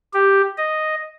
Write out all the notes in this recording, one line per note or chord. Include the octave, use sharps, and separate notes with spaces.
G4
D#5